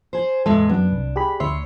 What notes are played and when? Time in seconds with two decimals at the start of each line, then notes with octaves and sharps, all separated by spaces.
0.13 G#4 C5
0.46 E2 A2 G#3 A4
0.69 F#2 B3 D4
0.92 C2
1.16 G4 G#4 B5
1.40 D2 C#5 E5 C6